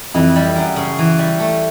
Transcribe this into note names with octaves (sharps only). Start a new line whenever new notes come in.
F2 E3
G3
F#2
C#3
E3
G3
A3